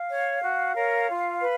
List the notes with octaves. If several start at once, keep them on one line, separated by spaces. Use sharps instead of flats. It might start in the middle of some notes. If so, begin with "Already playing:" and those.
Already playing: F5
C#5
F#4
A#4 C#5
F4
B4